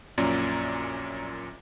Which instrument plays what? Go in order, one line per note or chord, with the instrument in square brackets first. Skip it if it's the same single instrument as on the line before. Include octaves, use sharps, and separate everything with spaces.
[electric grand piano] A#1 F#2 A#2 C#4 D5 A#5